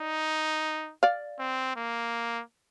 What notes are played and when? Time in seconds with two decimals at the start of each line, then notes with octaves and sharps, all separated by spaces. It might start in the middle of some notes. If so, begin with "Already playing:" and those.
Already playing: D#4 D5
1.03 D5 F5
1.40 C4
1.76 A#3